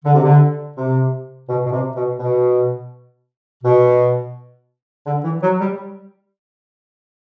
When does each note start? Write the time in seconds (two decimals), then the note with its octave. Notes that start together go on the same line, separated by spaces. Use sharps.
0.05 D3
0.14 C3
0.24 D3
0.77 C3
1.49 B2
1.66 B2
1.72 C3
1.97 B2
2.19 B2
3.63 B2
5.07 D3
5.24 E3
5.42 F#3
5.60 G3